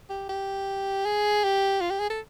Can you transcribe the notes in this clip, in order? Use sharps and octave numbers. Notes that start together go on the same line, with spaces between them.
G4
G4
G#4
G4
F4
G4
G#4
A4